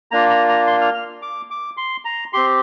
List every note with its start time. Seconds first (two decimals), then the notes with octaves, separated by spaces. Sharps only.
0.11 A#3 D4 F4 A#5
0.30 A#5
0.49 A#5
0.67 C6
0.81 F6
0.94 F6
1.22 D6
1.51 D6
1.77 C6
2.05 A#5
2.33 C4 G4 C6